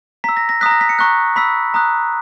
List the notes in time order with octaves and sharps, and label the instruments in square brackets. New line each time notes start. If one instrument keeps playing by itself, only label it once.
[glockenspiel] A#5 E6 B6
A#6
A#6
A#5 D#6 F#6 B6
A#6
B6
C#7
A#5 C#6 F#6
B5 E6 B6
A#5 D#6 F#6